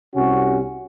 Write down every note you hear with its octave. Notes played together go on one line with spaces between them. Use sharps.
C2 C3 C#4 F#4